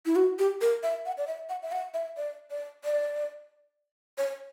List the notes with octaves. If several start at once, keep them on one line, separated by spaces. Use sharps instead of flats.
E4
F#4
G4
A#4
E5
F#5
D5
E5
F#5
E5
F#5
E5
D5
D5
D5
C#5